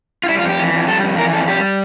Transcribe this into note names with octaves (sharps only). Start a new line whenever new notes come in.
F4
G3 E4
F4
F2
G4
E3
F2
G3 A4
F2
E3 A#4
F2 A4
G3 G4